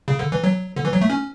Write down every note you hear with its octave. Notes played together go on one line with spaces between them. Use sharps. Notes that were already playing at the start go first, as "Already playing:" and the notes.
C#3
D3
E3
F#3
D3
E3
F#3
A3
C#4